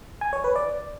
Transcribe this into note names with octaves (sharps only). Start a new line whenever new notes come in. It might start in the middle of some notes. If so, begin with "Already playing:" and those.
G#5
C#5
B4
D5